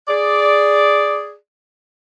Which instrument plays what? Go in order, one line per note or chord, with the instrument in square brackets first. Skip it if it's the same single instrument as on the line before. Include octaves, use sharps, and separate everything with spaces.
[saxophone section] G#4 D5